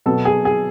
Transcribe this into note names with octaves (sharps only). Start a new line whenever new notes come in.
B2 F#3 B3 A4
G#4
G#4